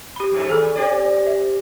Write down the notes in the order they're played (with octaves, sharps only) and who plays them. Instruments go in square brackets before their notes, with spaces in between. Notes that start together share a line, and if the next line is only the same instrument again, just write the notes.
[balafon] G4 B5
[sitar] F2 G#2 A3
[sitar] D#2 [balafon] G#4 A4
[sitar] C4 G4 D5
[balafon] E5